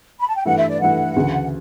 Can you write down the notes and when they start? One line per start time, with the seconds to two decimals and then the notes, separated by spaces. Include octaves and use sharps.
0.19 B5
0.28 A5
0.36 G5
0.45 G2 E3 A3 E4 F#5
0.57 E5
0.69 D5
0.80 G2 E3 A3 E4 F#5
1.16 D2 C#3 E3